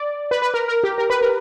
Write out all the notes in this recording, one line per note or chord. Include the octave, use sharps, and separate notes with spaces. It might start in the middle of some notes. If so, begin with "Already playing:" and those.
Already playing: D5
B4
B4
A#4
A#4
G4
A#4
B4
A#4